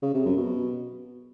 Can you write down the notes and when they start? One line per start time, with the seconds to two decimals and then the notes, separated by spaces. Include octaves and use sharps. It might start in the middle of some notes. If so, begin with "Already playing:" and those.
0.02 C#3
0.14 C3
0.26 F#2
0.37 B2